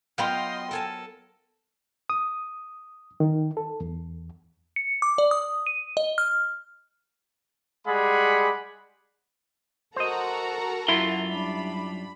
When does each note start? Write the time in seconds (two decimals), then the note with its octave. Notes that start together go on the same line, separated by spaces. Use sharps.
0.18 F#3 B3 F4 D#5 F5 G5 C6 F6
0.71 A4 A#4 G#5 A5
2.10 D#6
3.20 D#3
3.57 A4
3.81 E2
4.76 C#7
5.02 D6
5.18 D5
5.31 D#6
5.67 D#7
5.97 D#5
6.18 F6
7.87 G3 G#3 G#4 D5 F#5 B5
9.96 F#4 A4 A#4 C5 D#5 F#5 A#5
10.88 F#2 E4 F4 C6
11.29 G3 D4 B5